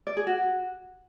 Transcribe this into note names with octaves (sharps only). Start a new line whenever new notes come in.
D5
G#4
F#4